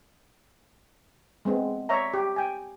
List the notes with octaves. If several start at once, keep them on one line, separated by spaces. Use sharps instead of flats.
G#3 B3 C4 D4
C#5 D5 E5 A#5
G4
G5 G#5